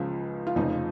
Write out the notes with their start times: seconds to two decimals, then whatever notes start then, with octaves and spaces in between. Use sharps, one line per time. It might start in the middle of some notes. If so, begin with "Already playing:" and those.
Already playing: C#2 C#3 F3
0.47 F4
0.56 F1 F2 C#3 F3 D#4